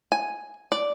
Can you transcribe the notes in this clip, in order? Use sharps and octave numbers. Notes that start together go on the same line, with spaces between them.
G#5
D5